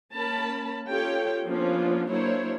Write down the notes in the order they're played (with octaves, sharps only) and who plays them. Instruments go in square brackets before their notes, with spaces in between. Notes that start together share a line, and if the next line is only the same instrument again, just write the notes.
[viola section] A#3 C#4 A#4 A5 B5
C#4 F4 G4 A4 C#5 G5
F3 A#3 B3 C#4 D4 F4
F#3 A#3 D4 E4 C5 C#5